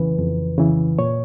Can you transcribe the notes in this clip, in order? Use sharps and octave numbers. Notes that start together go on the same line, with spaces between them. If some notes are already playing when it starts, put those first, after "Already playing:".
Already playing: F2 C#3 E3 B4
F2
C#3 E3
A#2 C#5